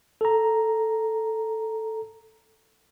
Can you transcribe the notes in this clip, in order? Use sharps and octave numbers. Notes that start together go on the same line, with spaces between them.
A4 A#5